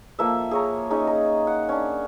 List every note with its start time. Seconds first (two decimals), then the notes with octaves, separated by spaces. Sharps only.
0.19 F3 A#3 A4 E5
0.51 G#4 C#5 A#5
0.90 C#4 D#4 G#4
1.07 G#4 A#5
1.47 F#5
1.69 C#4 D4